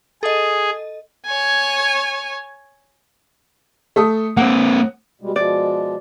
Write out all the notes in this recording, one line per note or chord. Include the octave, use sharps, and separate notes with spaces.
G#4 A4 D#5
C#5 G#5
A3 A4 D#6
A#3 C4 F#5
B2 G3 G#3
B2 F3 G#3 D5